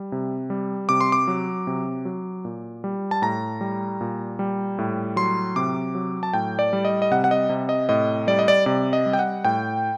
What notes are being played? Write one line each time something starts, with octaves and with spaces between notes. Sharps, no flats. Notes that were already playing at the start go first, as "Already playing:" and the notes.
Already playing: G3
C3
G3
C3 D6
C6
D6
F#3
C3
F#3
A#2
G3
A5
A2 A#5
G3
A#2
G3
A2
F#3 C6
C3 D6
F#3
A5
A2 G5
D5
G3
D#5
D#5
C3 F#5
F#5
D#5
C3
D#5
A2 D#5
G3 D5
D#5
D5
C3 D5
D#5
G3
G5
F#5
A2 G5